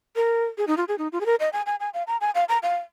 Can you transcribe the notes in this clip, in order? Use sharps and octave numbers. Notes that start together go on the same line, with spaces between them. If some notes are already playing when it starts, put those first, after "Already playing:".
A#4
G#4
D#4
F4
G#4
D#4
F4
G#4
A#4
D#5
G#5
G#5
G#5
F5
A#5
G#5
F5
A#5
F5